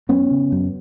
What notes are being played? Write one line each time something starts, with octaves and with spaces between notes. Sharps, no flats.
F#2 B3 C#4
C#3
F#2